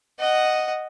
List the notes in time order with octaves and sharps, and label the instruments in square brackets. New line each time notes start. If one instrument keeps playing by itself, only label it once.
[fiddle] D#5 F#5